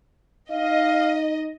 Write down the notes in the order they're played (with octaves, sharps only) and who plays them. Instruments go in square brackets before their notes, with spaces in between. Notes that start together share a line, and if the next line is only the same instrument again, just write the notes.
[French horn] D#4 [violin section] D#5 [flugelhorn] F5